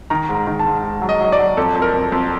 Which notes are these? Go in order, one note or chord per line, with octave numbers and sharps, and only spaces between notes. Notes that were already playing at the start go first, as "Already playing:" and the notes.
D#3 A#5
G#2
A#5
D#3
A5
G#2
G#2
F#3
D#5
F#3 D#5
D5
F#3
F2 A4
F2
A#4
F2
F2